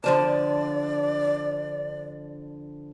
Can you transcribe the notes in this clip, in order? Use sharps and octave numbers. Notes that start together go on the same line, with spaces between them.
D3 F3 D5 A5